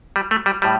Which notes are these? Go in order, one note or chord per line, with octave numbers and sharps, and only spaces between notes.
G3
A3
G3
A2 G3